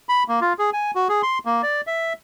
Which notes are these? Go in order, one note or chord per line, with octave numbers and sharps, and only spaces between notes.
B5
A#3
F4
G#4
G#5
F#4
G#4
C6
A#3
D5
E5